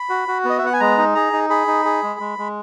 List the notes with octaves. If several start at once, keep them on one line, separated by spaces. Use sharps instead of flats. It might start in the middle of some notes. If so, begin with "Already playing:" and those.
Already playing: B5
F#4
F#4
B3 D#5
E5
B3 F#5
G#5
G#3 A#5
D#4
G#4 A#5
D#4
G#4 B5
D#4
G#4
G#3
G#3
G#3